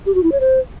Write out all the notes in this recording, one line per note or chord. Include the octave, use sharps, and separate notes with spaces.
G4
F#4
E4
C#5
C5